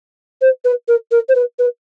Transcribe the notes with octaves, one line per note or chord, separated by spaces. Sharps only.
C5
B4
A#4
A#4
C5
B4
B4